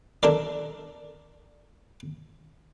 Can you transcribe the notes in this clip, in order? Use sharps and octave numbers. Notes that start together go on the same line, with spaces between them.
D4 A4 A#4 D5